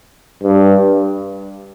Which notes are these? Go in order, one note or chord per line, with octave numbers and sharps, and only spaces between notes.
G2